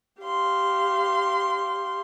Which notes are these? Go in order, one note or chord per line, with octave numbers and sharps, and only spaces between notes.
G4 F5 C6